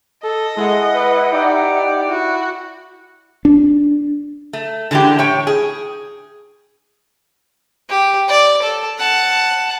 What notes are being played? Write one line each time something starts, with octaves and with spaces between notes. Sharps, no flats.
A4 D#5
G#3 E4 F#5
B4
D#4 G4 D5
E4 F#4
D4
A3
D3 E3 G#3 C#4 G4
A2 C#5 G5
G#4
G4
D5
A4
F#5 A5